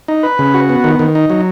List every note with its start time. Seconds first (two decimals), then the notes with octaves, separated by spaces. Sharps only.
0.08 D#4
0.23 B4
0.39 C#3
0.54 F#4
0.69 B3
0.84 D#3
0.99 D#3
1.15 D#4
1.30 F#3